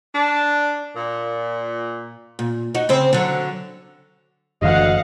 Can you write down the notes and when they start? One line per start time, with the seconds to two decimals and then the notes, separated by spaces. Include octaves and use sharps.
0.14 D4
0.96 A#2
2.39 A#2
2.75 D#4 F#4
2.89 C#3 C4 C5
3.13 D3 F#3
4.62 F#1 D2 E3 D#5 F5 F#5